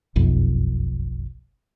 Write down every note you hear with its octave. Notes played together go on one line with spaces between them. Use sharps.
F#1 B1 F2